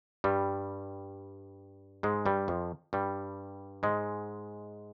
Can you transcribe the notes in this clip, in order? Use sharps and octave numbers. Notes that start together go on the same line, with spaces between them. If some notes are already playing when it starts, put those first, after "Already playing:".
G2 G3
G#2 G#3
G2 G3
F2 F3
G2 G3
G#2 G#3